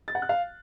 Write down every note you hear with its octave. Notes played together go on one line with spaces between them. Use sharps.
A6
F#5
F#6
F5